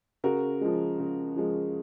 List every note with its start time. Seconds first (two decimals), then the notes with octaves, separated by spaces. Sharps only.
0.24 C#3 F#4 A#4
0.61 F3 G#3
0.99 C#3
1.36 F3 G#3